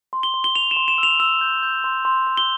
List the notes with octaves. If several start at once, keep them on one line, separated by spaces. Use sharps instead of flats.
C6
G7
C6
G7
C6 F7
E7
C6
E7
E6 F7
E6 F7
G6
G6
C6
C6
C6
G7